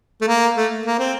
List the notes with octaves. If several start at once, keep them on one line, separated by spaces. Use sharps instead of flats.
A3
A#3
A3
A#3
C4